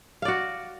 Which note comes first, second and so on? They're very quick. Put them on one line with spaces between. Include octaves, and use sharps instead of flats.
F5 D5 F#4